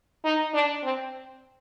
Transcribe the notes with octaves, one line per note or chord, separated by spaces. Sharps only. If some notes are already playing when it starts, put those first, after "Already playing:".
D#4
D4
C4